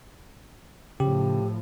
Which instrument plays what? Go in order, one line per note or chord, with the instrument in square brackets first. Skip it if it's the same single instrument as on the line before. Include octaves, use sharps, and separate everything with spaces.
[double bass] A2 F3 [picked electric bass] C#3 [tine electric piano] G4